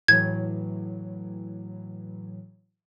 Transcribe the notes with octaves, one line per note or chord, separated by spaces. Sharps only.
A2 E3 F#3 G#6